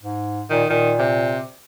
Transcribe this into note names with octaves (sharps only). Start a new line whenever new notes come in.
G#2
A#2 D#3
A#2 D#3
C3